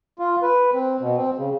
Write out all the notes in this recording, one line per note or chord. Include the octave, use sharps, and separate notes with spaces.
F4
B4
C4
B2
C4
C#3